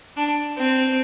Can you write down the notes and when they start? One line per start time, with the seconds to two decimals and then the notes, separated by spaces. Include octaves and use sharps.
0.17 D4
0.58 C4